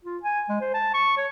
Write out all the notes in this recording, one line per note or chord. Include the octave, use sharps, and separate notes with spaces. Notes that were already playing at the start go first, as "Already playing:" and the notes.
F4
G#5
G#3
C5
A5
C#6
C#5